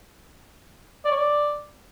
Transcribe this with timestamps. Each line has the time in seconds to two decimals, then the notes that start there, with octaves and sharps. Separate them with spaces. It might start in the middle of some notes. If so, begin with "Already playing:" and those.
1.05 D5
1.11 C#5
1.18 D5